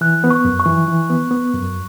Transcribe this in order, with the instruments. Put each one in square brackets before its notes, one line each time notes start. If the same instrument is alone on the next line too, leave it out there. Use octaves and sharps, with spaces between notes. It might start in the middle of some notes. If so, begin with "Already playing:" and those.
[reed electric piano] E3 [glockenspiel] F#6
[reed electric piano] B3
[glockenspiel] C#6
[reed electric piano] F#2
[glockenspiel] C#6
[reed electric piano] E3
E3
B3
B3
F#2